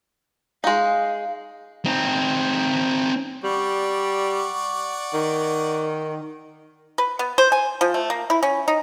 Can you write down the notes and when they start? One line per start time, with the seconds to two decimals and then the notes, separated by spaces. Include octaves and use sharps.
0.64 G#3 D#4 F5
1.86 C4 D#4
3.44 G3 D5 F#5 C#6
5.14 D#3
6.98 B4
7.19 B3
7.38 C5
7.52 G#5
7.81 F3
7.94 A3
8.10 A#3
8.30 E4
8.43 C#4
8.68 D#4